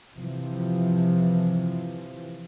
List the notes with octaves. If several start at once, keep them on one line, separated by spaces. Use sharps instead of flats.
C3 E3 F3